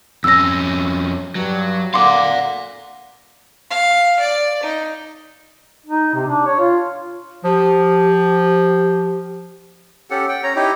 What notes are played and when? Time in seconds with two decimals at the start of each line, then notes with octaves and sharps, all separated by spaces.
0.24 F2 C#4 E6 A#6
1.35 G2 F#3
1.94 D3 A#3 D5 F5 F#5 C6 D6
3.71 F5
4.19 D5
4.63 D#4
5.86 D#4
6.14 C3
6.27 D4
6.46 C#5
6.60 F4
7.44 F3 G4
10.10 C#4 G4 A4 F#5
10.29 F#5 G5
10.43 C#4 C#5 A#5
10.56 D#4 E4 G4